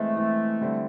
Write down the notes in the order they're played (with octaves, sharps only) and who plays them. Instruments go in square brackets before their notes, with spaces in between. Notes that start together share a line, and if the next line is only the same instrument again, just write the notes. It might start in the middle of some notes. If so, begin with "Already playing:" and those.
Already playing: [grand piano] E3 G#3 C4 [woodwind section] A3
[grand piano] E3 G#3 C4
D3 G3 C4 E4